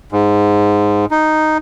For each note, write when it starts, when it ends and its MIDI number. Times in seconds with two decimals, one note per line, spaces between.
0.12 1.05 44
1.11 1.58 63